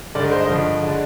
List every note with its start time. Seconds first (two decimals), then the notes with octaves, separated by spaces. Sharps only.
0.15 G2 D3 G#3 D#4 D5
0.23 A#4
0.32 C5
0.40 D#5
0.49 G2 D3 F3
0.83 D3 G#3 D4